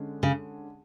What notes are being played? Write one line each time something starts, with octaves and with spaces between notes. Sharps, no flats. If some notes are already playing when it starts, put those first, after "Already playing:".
Already playing: D3 G#3 C#4
C#3